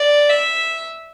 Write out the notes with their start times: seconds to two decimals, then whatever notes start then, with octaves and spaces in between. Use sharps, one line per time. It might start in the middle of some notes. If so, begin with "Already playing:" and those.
Already playing: D5
0.30 E5